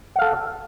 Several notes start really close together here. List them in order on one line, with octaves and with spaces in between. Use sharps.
F#5 F5 A4